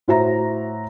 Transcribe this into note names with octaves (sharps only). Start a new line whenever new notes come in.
A2 F#4 C5 E5 A#5 A#6